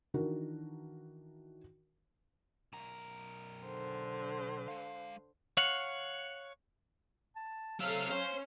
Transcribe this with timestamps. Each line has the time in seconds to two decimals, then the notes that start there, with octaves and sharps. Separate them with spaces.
0.14 D#3 E3 D4 F#4 A#4
2.73 B1 A#4
3.65 D3 C5
4.68 G#3 F5
5.57 C#5 F5 F#5
7.36 A5
7.80 F#3 C4 A4 E5 F5
8.11 C#4 C5